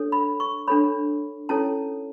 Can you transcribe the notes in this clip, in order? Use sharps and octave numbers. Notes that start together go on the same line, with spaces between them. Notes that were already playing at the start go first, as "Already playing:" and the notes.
Already playing: D4 A4 C#5
B5
C#6
D4 A4 C#5 B5
C#4 E4 A4 C#5 A5